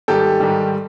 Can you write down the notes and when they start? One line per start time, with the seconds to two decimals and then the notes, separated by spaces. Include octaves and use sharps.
0.08 G#2 D#3 G3 G4 A4
0.40 G#2 D#3 G3